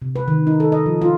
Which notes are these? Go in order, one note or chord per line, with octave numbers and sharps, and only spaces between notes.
C3
B4
D#3
D#4
A4
D#5
F3
F4